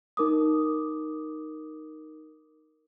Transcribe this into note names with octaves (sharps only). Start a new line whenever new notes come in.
D#4 A#4 D6 D#6